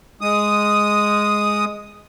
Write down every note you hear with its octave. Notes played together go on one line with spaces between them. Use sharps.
G#3 D#6